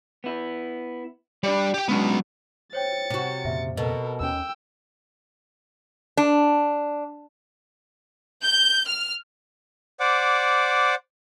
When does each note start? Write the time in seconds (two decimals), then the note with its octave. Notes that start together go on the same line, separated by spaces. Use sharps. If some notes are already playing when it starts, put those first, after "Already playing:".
0.24 B3 E4
1.43 G3 D4 D5
1.74 G4 G5
1.88 F#3 G#3 B3 C#4 D4
2.73 C5 C#5 G5 A6 C#7
3.10 C3 F#4
3.45 F2 A#2 C#3 E5
3.77 B2 A4 A#4 D#5
4.20 D#2 C#4 G5 E6
6.17 D4
8.42 G6
8.87 F6
10.00 C5 D5 F#5 D6